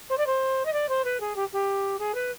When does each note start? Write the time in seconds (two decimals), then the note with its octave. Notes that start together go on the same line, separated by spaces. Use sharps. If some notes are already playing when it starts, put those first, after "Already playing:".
0.10 C5
0.18 D5
0.27 C5
0.65 D#5
0.73 D5
0.89 C5
1.04 B4
1.20 G#4
1.36 G4
1.53 G4
1.99 G#4
2.15 B4